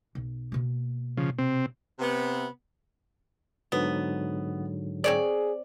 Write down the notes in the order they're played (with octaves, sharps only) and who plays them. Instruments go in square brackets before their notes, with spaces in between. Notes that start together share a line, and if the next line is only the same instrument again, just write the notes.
[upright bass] B1
B2 A#3
[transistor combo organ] C#3 F3
C3 C4
[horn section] C3 B3
[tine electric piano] G#2 D3 F#3 [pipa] B3
[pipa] C4 C#5 D5 [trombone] G#4